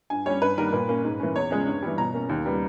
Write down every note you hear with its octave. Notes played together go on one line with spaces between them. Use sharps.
G2 G#5
G3 C#4 C#5
G2 B4
D#3 G3 A#3 A#4
A#2 B4
A#3 C#4
G#2
E3 A#3 C#4
E2 C#5
C#3 G#3 C#4
G2
E3 G3
B2 A#5
A#3 C#4
D#2
C#3 G3 B3